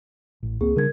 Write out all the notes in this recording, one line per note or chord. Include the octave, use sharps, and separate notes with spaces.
A1
C#2 A#3 C4 G#4
C#3 G3 D4 A#4 G#6